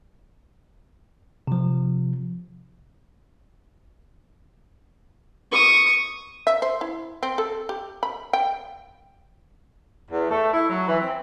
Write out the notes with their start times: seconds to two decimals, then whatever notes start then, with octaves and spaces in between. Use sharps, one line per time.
1.47 C3 F3
5.52 C#6 D#6
6.47 E5
6.62 C5
6.81 E4
7.23 C4
7.38 A4
7.69 G4
8.03 B5
8.33 G5
10.11 E2
10.30 A3
10.53 E4
10.69 F#3
10.88 E3
11.01 C4